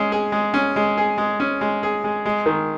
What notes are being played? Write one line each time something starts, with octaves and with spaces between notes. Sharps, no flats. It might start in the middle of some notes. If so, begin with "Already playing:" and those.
Already playing: G#3 C#4
G#4
G#3
C#4
G#3
G#4
G#3
C#4
G#3
G#4
G#3
G#3
D#3